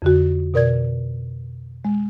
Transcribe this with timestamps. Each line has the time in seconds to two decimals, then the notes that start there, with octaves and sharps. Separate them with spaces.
0.02 F2 D3 F#4
0.54 B2 A#4 D5 G#6
1.85 G#3